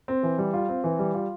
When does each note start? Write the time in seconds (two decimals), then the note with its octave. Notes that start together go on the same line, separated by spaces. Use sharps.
0.08 C4
0.23 E3
0.38 G3
0.54 F4
0.69 C4
0.84 E3
0.99 G3
1.14 F4